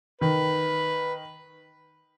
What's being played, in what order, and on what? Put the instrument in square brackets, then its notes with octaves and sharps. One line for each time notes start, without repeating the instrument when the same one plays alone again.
[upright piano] D#3 [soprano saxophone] B4